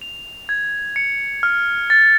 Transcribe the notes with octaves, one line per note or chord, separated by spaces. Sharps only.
F7
G#6
C#7
F6
A6